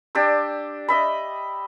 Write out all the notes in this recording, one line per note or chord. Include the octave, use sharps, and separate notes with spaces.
D4 G4 E6
D#5 E5 B5